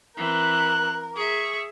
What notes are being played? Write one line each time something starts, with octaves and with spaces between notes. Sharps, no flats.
E3 C4 A#4 F#6
G#4 E5 C#6